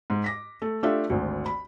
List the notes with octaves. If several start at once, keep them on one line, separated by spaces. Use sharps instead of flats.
G#2
D6 A#6 B6
A3
A3 D4 F4 G4 E5 F5
G#1 D2
B5